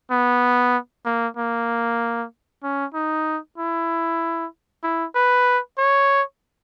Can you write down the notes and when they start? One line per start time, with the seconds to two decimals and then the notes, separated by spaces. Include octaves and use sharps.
0.11 B3
1.05 A#3
1.37 A#3
2.63 C#4
2.94 D#4
3.58 E4
4.83 E4
5.15 B4
5.78 C#5